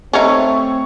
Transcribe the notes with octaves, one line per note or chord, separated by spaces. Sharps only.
A3 C4 C#4 D#4 C#6